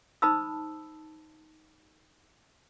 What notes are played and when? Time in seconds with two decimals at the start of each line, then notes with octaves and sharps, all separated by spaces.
0.22 D#4 C5 A5 B5 D#6 E6